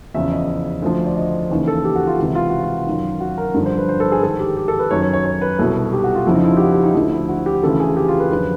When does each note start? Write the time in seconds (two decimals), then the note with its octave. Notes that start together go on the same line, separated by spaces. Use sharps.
0.14 E2 C#3 F3 E5
0.32 D#5
0.82 D2 D3 F3
1.06 D5
1.17 D#5
1.51 D#2 C#3 E3
1.67 A4
1.85 G4
1.96 F#4
2.07 F4
2.19 C#2 C3 E3 F#4
2.35 F4
2.50 F#4
2.63 F4
2.86 F#2 D#3
3.20 F#4
3.38 A#4
3.54 G2 D3 F3
3.66 C5
3.78 B4
3.89 C5
4.00 A4
4.12 G#4
4.22 G#2 D#3 A4
4.40 G4
4.57 G4
4.68 A4
4.79 B4
4.90 F#2 D#3 C#5
5.02 C#5
5.13 C#5
5.25 C#5
5.41 B4
5.59 C2 B2 A4
5.93 G4
6.04 F#4
6.15 F4
6.26 F2 C#3 F3 E4
6.35 D#4
6.44 E4
6.52 F4
6.57 G4
6.61 F#4
6.72 G4
6.83 D#4
6.95 D2 D3 F3 E4
7.12 E4
7.29 F#4
7.46 G4
7.63 D2 C#3 E3 A4
7.80 G#4
7.97 G4
8.08 F4
8.20 B4
8.31 F#2 D3 F3 B4